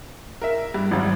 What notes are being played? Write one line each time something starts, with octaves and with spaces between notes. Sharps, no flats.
A#4 E5
G2
G#1 F#2